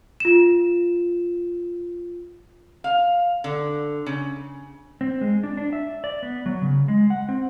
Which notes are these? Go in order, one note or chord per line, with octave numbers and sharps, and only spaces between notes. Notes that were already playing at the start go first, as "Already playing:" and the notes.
F4 E7
F5
D3
C#3
C4
G#3
D4
D4
E5
D5
B3
F#3
C#3
G#3
F#5
C4